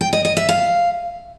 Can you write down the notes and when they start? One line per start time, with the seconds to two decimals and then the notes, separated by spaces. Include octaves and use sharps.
0.01 G5
0.13 D#5
0.25 D#5
0.37 E5
0.49 F5